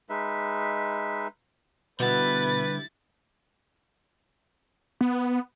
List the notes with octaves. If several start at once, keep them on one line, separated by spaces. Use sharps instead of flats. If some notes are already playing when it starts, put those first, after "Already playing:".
G#3 D#4 B4 E5
B2 D3 G3 B3 E4 B4 A6
B3